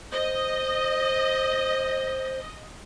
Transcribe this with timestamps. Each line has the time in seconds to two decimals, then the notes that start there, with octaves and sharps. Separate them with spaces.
0.13 C5 D#5